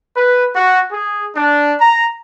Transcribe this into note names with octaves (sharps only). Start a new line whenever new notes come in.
B4
F#4
G#4
D4
A#5